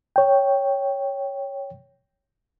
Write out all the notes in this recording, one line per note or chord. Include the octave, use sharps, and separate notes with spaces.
C#5 G5